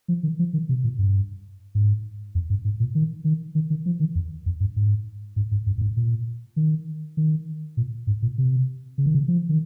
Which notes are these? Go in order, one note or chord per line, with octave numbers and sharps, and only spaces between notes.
F3
D#3
F3
D#3
C3
A#2
G2
G#2
F2
G2
G#2
A#2
D#3
D#3
D#3
D#3
F3
D#3
F2
F2
G2
G#2
G#2
G#2
G2
G2
G#2
A#2
D#3
D#3
A#2
G#2
A#2
C3
C#3
D#3
C#3
F3
D#3